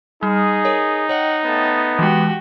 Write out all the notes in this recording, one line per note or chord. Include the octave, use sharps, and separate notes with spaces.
G3 D#4 G#4
A#4 C#5
C#5 D#5 F#5 G5
A3 B3 A5
E3 G#3 F#4 G4